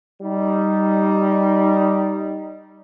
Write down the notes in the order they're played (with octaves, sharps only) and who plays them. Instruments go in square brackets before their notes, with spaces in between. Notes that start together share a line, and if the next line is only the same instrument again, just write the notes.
[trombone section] G3 D#4